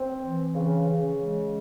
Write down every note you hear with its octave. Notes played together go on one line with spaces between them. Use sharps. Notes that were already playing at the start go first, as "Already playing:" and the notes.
Already playing: C4
E3
C#3
C#3
G#3